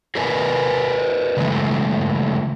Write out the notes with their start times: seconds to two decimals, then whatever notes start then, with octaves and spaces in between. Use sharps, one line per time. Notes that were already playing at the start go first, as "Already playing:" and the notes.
0.15 G#4 A#4 B4 D5 G#5
1.37 C#3 E3 G#3 A3